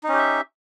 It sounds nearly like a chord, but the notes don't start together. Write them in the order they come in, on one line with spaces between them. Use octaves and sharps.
D#4 C#4 G4 E5